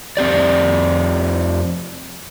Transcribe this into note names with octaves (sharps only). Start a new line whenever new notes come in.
F2 C4 G4 D5